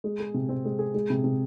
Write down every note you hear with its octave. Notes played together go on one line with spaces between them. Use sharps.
G#3
G#4
C3
C4
G#3
G#4
G#3
C3
C3